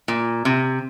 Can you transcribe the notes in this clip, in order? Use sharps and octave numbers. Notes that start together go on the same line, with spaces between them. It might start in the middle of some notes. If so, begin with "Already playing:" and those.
A#2
C3